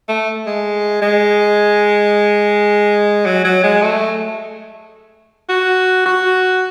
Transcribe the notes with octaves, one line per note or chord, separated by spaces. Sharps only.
A3
G#3
G#3
F#3
F#3
G#3
A3
F#4
F#4